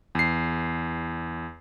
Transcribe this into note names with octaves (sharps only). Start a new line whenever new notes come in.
E2 C7